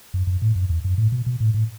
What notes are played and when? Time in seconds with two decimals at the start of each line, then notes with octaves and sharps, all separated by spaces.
0.14 F#2
0.27 F#2
0.42 A2
0.55 F#2
0.70 E2
0.85 F#2
0.98 A2
1.12 B2
1.26 B2
1.40 A2
1.54 A2